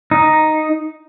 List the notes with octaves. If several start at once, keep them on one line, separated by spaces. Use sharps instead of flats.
D#4